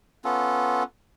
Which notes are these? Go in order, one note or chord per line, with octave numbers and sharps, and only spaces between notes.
B3 C#4 F4 A4